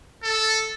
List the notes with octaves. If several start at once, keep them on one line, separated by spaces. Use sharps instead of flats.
A4